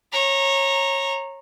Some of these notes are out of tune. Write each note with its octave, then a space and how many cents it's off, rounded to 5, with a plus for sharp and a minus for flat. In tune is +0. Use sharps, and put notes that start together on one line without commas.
C#5 -25 A#5 +0